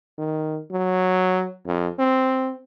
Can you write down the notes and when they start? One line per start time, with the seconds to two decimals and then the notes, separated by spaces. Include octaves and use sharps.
0.18 D#3
0.71 F#3
1.67 F2
1.99 C4